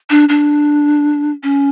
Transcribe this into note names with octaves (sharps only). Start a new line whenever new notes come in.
D4
D4
C#4